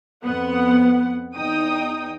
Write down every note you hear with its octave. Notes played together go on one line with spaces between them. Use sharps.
F2 B3 F#5
E2 D#4 G5 D#6